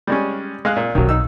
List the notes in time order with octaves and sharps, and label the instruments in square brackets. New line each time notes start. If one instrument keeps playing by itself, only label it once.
[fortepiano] G3 G#3 C#4
G#3 F5 F#6
A#2
[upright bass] B1 C#4 [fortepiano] D#3 F#3
[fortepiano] D#4 E6